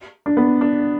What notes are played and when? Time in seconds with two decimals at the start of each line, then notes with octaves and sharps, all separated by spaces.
0.26 D4
0.37 B3
0.61 D4